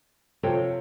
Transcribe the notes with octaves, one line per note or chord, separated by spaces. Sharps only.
C3 F3 A4 C#5 G5